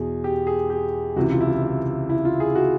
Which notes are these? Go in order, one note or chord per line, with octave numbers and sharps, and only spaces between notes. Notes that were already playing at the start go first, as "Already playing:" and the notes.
Already playing: E2 B2 G#4
G4
G#4
G4
C#2 C3 E3 F#4
F4
E4
F4
E4
E4
F4
G#4
F#4